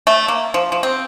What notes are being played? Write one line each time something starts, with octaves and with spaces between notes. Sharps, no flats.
A3
A#3
F3
F3
C4